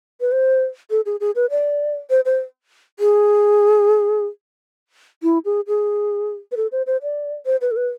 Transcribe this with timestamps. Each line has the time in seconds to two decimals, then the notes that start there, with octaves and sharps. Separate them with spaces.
0.21 B4
0.32 C5
0.90 A4
1.06 G#4
1.20 G#4
1.35 B4
1.50 D5
2.10 C5
2.25 C5
3.00 G#4
5.23 E4
5.45 G#4
5.67 G#4
6.52 B4
6.57 A4
6.72 C5
6.87 C5
7.02 D5
7.46 C5
7.61 B4
7.71 A4
7.77 B4